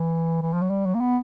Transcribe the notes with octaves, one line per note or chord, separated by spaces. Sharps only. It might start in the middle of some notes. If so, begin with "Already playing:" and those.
Already playing: E3
E3
F3
F#3
G3
F#3
A#3
B3